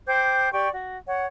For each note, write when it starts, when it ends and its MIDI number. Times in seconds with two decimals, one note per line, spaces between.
0.07 0.51 72
0.07 0.51 79
0.07 0.51 86
0.07 0.51 91
0.52 0.68 67
0.52 0.68 74
0.52 0.68 79
0.52 0.68 85
0.73 0.98 66
1.07 1.25 73
1.07 1.25 78